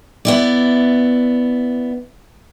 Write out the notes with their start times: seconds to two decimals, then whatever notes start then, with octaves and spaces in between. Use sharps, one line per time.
0.25 B3 E4 D5